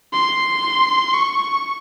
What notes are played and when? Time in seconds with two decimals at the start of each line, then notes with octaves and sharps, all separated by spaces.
0.13 C6
1.14 C#6